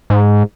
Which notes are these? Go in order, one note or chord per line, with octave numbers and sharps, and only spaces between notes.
G#2